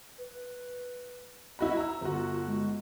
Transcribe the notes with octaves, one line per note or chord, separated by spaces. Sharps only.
B4
E4 F#4 D#5 B5
E5 A#5 E6
G1 F4 F#4
G#3